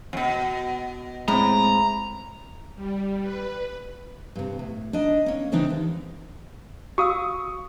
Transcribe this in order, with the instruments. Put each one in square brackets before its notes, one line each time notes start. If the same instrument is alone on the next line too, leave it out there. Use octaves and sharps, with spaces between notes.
[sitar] F2 B2
[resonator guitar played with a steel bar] A2 [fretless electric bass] G#3 C4 [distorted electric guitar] A#5
[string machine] G3
B4
[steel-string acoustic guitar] G2 C3
A2
D4 D#4 D#5
A#3 C#4
C#3 E3 C4 D4 D#4
D#2
[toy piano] F#4 F5 E6 [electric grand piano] C#6 D#6